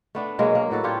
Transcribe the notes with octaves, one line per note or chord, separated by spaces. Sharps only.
A3 B3 D4
B2 F#3 G#3 A#3
A#3
A2 B3 F#4 A4
D4 F4 G4 C#5